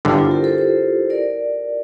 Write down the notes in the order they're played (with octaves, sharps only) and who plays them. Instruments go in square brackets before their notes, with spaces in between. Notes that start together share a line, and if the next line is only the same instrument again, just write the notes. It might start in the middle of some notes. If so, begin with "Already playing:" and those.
[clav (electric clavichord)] G1 G2 D3 [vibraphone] E4 G4
[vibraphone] F4 A4
C5
G4 A#4
A4 C5
A4 C5
A#4 D5